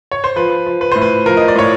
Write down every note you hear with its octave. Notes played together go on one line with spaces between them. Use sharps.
C#5
C5
F3 B4
F3
B4
A2 C5
B4
F3 A#4
D#5
D5
A2 C#5